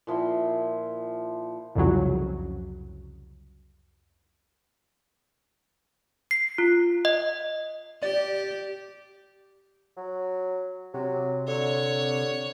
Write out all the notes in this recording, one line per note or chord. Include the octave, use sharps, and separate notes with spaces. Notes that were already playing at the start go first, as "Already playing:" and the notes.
A#2 F3 E4 G5
C2 F2 C#3 F#3
C7
F4
D#5
G4 D5
F#3
C3 F#3
D3 C#5